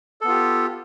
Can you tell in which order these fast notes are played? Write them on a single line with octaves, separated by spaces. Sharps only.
A4 B3 F4 G4